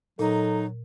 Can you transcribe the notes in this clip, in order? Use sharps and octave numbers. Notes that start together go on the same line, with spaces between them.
A#2 F#3 D#4 A4